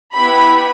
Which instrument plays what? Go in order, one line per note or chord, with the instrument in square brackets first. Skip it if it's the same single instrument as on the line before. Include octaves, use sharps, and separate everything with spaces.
[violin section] B3 E4 G4 B5